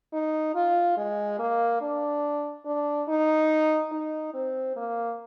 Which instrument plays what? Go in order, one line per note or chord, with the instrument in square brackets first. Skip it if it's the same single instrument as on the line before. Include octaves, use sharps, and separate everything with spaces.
[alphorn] D#4
F4
G#3
A#3
D4
D4
D#4
D#4
C4
A#3